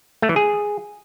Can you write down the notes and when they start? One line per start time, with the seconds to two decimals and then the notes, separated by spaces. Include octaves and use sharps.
0.22 A3
0.29 E3
0.36 G#4